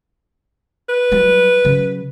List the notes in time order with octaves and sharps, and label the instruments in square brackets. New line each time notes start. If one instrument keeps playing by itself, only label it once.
[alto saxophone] B4
[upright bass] F#3 G3
C#3 F#3